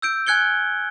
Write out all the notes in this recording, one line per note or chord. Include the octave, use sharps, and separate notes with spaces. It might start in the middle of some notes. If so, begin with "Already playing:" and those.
E6 G6 D7
G#5 F#6 G#6 C#7 G7